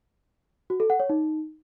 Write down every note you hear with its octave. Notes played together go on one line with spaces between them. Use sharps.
F#4
A4
F#5
C#5
D#4